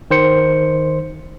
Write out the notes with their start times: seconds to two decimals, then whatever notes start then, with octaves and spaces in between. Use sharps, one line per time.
0.11 D#3 C5 C#7